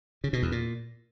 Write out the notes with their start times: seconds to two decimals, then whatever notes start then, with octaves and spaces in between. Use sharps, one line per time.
0.24 C#3
0.33 B2
0.42 E2
0.52 A#2